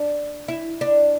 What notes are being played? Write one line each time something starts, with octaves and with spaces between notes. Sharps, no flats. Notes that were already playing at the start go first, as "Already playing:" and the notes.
Already playing: D4
E4
D4